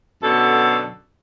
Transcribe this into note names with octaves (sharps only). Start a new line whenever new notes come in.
F#2 B2 D3 A4